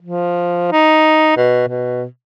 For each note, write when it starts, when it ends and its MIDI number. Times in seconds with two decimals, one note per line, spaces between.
0.02 0.70 53
0.72 1.33 63
1.37 1.64 47
1.68 2.05 47